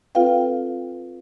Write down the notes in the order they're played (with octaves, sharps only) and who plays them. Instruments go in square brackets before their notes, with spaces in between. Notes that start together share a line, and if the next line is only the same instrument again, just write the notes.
[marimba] C4 F4 A4 B4 F5 G5